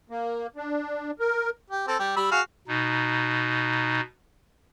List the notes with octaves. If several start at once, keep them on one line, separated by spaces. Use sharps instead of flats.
A#3
D4
A#4
G4
C4 A4
G3 G4
G3 B5 E6
F#4 G#4 F5
B2 D#4